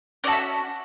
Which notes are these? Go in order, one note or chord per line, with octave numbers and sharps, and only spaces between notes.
C#4 F#4 A4 D5
E5